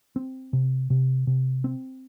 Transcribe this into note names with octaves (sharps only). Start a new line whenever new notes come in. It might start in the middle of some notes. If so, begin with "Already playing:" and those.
C4
C3
C3
C3
C4